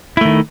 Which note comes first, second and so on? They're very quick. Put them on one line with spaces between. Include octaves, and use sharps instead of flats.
E4 A3 D#3